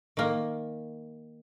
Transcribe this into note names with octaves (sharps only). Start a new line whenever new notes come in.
D#3 A#3